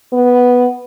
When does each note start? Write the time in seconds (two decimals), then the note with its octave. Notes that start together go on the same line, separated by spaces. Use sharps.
0.13 B3